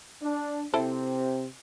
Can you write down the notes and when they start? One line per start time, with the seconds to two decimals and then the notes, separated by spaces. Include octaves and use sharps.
0.22 D4
0.74 C3 C4 E4 A4 C5